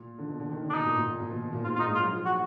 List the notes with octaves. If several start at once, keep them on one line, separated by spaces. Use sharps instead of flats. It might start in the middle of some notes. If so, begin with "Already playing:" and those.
Already playing: A#2
D3
B2
D3
D#3
D3
D4
B2 D#4
A#2
A#2
A#2
A#2
B2
B2
A#2
G#2 F4
A#2 D#4 F4
G#3
F4
F#3
F3
F#4